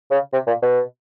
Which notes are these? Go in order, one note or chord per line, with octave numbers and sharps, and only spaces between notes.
C#3
C3
A#2
B2